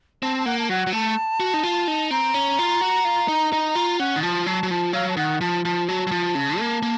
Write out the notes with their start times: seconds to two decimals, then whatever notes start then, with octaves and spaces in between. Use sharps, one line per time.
0.23 C4 A5
0.39 A5
0.46 A#3 F#5
0.59 A5
0.69 F#3 F#5
0.87 F#3
0.93 A3 A5
1.40 F#4
1.54 D#4
1.63 F4
1.88 D#4
2.11 C4 A#5
2.34 C#4
2.59 F4
2.81 F#4
3.05 F4
3.28 D#4
3.53 D#4
3.75 F4
4.00 C#4 F#5
4.16 D#3
4.23 F3 A5
4.46 F#3 A5
4.63 F#3
4.71 F3 A5
4.93 F#3 F5
5.09 A5
5.17 D#3 F#5
5.41 F3 A5
5.65 F3 A5
5.88 F#3 A5
6.07 F#3
6.12 F3
6.35 C#3
6.59 A#3
6.82 A#3